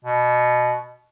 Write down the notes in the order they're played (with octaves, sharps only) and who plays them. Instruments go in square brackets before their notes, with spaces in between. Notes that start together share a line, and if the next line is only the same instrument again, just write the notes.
[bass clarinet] B2